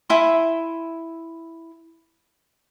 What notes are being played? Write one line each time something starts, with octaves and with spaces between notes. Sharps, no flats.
E4 E5 G#5 C6